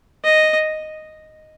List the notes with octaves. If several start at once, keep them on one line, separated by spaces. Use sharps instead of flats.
D#5